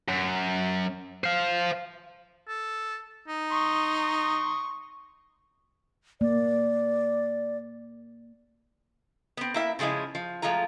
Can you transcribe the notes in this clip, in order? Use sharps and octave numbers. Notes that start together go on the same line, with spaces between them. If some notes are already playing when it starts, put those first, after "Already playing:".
F#2
C5 F5
A4
D#4
C6 C#6 D#6
A#3 D5
B3 C4
A#3 E4 E5
C#3 F3 G#3 C#4 E4
F3
F3 G#3 A3 F4 A#5